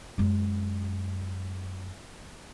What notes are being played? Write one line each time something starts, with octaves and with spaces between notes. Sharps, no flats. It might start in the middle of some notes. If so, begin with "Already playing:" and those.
F#2 G#3